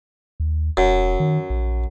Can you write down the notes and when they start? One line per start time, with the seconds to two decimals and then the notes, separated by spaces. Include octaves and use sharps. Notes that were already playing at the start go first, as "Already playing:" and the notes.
0.40 D#2
0.77 E1 F#2
1.20 D#3
1.50 A#1